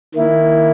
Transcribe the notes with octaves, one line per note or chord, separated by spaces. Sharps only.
D#3 A#3 E4